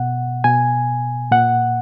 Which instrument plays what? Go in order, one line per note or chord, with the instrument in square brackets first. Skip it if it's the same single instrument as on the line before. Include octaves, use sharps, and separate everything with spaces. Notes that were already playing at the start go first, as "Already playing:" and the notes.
Already playing: [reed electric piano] B2 F#5
B2 G#5
A#2 F#5